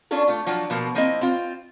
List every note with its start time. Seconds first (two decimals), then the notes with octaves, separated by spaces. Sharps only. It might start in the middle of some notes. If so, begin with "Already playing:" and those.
0.11 C#4 D4 F4 A4
0.28 A3 F4
0.46 F3 F#3 D4 F4
0.70 B2 F3 A#3 F4
0.95 F3 A#3 C4 E4 D#5
1.21 C4 F4